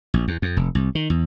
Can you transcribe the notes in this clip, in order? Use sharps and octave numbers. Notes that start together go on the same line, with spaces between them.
A#1
E2
F2
F1
C2
D#3
E2